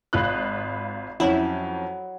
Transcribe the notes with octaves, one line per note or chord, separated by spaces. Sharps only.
G#1 F4 D#5 B5 F#6
F2 F#3 C#4 E4